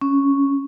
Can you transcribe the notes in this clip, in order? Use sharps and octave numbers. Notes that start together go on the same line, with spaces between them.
C#4